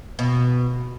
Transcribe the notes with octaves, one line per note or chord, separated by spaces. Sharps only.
B2